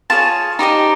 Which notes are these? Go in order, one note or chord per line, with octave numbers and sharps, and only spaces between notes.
F4 G#4 C#5 A5
D#4 G4 C5 D#5